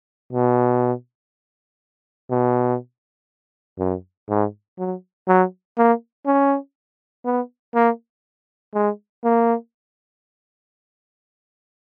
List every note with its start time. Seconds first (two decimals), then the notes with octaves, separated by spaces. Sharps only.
0.33 B2
2.31 B2
3.79 F#2
4.29 G#2
4.78 F#3
5.28 F#3
5.78 A#3
6.26 C#4
7.25 B3
7.75 A#3
8.74 G#3
9.24 A#3